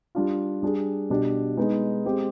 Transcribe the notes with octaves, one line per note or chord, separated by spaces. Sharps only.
G3 D4 F4
G3 D4 G#4
B2 G3 D4 G4
G#3 B3 D#4
G#3 C4 G4